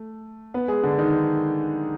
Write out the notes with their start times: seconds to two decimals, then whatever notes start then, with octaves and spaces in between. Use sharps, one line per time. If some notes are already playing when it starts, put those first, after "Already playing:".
Already playing: A3
0.54 B3 B4
0.68 G#3 G#4
0.83 D3 D4
0.98 D#3 D#4